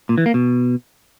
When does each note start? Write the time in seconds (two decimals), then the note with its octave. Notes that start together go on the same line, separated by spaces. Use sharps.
0.09 A#2
0.18 E3
0.26 A#3
0.34 B2